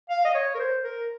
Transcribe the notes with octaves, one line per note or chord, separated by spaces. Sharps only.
F5
D#5
C#5
A#4
C5
A#4